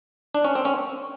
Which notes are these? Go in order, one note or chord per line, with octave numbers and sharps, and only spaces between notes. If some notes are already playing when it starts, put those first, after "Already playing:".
D4
C#4
C4
C#4